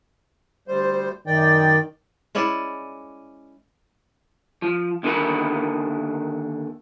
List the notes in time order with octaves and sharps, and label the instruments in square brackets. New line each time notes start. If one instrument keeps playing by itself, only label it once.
[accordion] D2 G3 C5
[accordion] F#2 D5 G5 [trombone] D#3
[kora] G#3 C#4 E4 D5
[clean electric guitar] F3
D#2 D3 D#3 A#4 B5